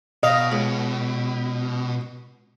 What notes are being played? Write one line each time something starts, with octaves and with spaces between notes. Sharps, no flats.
B2 D#5 F5
C#2